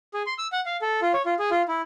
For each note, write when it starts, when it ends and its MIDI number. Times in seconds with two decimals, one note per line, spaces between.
0.14 0.23 68
0.26 0.34 84
0.38 0.47 88
0.52 0.61 78
0.66 0.77 77
0.82 1.00 69
1.02 1.12 65
1.14 1.22 73
1.26 1.34 65
1.39 1.50 68
1.51 1.62 65
1.68 1.82 64